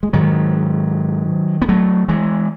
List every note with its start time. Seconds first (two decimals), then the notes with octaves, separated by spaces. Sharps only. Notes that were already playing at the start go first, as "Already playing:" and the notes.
0.03 G#3
0.13 G#2 D#3 F#3
1.62 B3
1.69 F#3 A3
2.08 E3 G#3